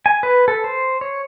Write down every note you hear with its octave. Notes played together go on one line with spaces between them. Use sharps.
G#5
B4
A4
C5
C#5